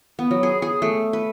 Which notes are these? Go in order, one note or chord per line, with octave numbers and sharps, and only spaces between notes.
B3
F#3
G#4
G#4
A3
B4